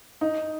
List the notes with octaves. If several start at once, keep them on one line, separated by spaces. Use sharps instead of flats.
D#4